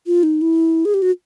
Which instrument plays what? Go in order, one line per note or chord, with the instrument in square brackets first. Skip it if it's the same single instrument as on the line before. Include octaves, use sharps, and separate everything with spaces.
[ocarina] F4
D#4
E4
G#4
G4
F#4